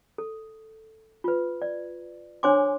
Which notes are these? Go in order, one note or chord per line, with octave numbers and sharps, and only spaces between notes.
A4
F4 B4
D5
D4 C5 C#5 G#5 C6 D6